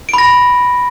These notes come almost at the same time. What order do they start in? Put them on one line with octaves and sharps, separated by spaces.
D7 B5 A#6